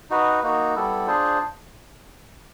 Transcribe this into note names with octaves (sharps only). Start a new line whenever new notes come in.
D#4 F#4 B4
A#3 D#4 F#4
G3 B3 E4 A4
D4 F4 G#4 C5